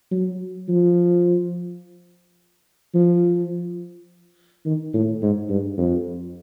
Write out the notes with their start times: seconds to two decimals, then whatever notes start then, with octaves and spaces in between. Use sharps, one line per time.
0.11 F#3
0.68 F3
2.94 F3
4.66 D#3
4.93 A2
5.22 G#2
5.49 G2
5.78 F2